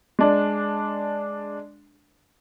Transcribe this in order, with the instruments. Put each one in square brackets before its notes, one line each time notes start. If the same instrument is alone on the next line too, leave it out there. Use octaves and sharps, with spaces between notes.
[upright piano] G#3 D4